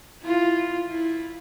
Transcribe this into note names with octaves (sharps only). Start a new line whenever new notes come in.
E4 F4
E4